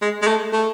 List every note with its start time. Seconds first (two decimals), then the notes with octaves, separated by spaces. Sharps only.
0.02 G#3
0.22 G#3
0.27 A3
0.53 A3